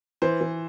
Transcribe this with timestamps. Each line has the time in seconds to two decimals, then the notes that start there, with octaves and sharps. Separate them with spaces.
0.22 E3 C5
0.41 E3